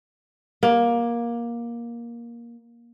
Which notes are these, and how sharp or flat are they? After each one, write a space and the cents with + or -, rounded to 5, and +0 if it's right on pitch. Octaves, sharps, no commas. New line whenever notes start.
A#3 +15